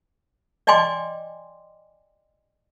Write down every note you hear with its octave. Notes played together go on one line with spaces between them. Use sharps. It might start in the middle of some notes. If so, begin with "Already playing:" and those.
D5 D#5 G5 G#5 C6 D6